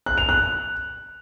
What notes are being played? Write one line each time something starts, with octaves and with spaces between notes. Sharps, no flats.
F#6
F7
F#6